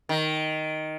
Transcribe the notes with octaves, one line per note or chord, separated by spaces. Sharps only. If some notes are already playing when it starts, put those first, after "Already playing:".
D#3